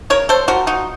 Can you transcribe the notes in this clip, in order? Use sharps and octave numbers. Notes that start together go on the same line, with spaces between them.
C#3 A#4 C#5
A4 C5
F3 F#4 A#4
D#4 F#4